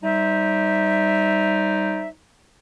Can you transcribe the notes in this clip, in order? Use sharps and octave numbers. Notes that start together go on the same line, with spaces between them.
G3 D#4 C5 D5 E5